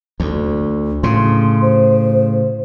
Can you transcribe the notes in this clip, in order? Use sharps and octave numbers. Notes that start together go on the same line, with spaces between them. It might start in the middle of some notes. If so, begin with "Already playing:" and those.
D2
A2 C#3 C6
C5